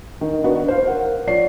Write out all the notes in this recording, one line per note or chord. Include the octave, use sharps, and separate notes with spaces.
D#3
B3 D4 D#4 F#4 B4
C5 F5
A#4 F#5
F3 C#5 D5 C7